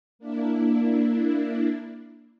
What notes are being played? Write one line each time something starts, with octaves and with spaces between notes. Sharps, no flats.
A#3 D4 E4